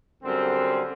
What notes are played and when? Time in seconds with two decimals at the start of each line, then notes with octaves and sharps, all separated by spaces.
0.23 F#2 D3 G3 C4